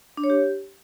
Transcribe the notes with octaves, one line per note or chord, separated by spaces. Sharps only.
D4
C#5
G4